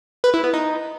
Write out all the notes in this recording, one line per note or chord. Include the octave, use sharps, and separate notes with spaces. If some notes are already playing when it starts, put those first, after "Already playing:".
B4
E4
B3
D#4